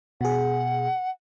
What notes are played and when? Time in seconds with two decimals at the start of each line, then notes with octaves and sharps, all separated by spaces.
0.21 B2 G#4 F#5